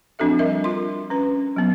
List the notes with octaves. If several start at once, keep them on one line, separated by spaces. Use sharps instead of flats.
F3 C4 D4 F#4 A4 E5
G3 A#4 D#5 E5
F4 C6
C#4 B4
F#3 B3